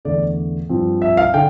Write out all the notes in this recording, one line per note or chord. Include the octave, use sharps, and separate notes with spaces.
E2 D3 A3 D5
G2 F3 C4
E5
F5
D3 G5